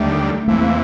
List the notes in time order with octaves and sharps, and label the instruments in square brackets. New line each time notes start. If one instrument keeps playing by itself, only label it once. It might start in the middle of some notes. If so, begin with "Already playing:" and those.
Already playing: [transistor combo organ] D#2 D3 G3 [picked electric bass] A3
[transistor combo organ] E2 C3 E3 [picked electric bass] A3
[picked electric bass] A#3